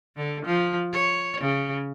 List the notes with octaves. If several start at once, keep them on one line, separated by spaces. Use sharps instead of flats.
D3
F3
C#5
C#3